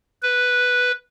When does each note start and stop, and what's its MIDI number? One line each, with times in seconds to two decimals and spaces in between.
0.23 0.92 71